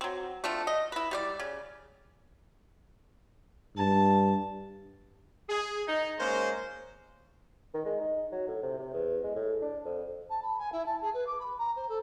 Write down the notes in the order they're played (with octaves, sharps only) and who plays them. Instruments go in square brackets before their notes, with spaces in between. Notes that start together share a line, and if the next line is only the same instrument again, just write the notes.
[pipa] F#3 C4
A3 C4 D4 F4
D#5
E4 B4
G3 C5 D5
C#3
[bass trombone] G2 [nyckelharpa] A5
[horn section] G#4
D#4
G#3 A#3 C#4 C5
[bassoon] D#3
G#3
D#4
F#3
A2
C3
C3
E2
G#3
A2
D4
F2
[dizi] A5
B5
G#5
E4
A5
G#4
B4
D6
B5
A#5
C5
A4